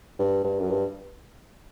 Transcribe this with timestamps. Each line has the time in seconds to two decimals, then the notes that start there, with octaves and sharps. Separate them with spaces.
0.19 G2
0.44 G2
0.59 F#2
0.70 G2